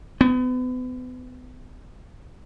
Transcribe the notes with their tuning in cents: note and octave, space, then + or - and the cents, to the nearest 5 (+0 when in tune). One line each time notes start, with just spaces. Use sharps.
B3 +35